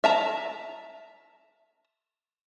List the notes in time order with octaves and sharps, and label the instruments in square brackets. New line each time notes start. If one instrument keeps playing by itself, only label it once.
[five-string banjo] E5 A5 A#5